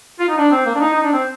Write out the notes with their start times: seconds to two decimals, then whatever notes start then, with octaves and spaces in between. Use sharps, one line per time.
0.20 F4
0.29 D#4
0.38 D4
0.52 C4
0.66 A#3
0.75 D4
0.80 D#4
0.94 D#4
1.03 D4
1.13 C4